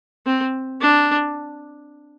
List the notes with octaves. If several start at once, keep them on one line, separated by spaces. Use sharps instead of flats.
C4
D4